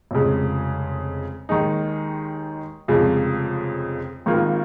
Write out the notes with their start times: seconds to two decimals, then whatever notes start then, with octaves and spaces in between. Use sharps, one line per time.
0.11 F1 F2 C#3 G#3
1.49 D#2 D#3 G#3 D#4
2.88 F1 F2 C#3 F3 G#3
4.26 G#1 G#2 D#3 A#3 F4